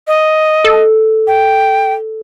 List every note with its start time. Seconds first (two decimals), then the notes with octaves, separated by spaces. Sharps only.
0.07 D#5
0.64 A4
1.27 G5